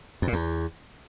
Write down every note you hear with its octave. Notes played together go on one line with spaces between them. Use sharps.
F2
A#2
E2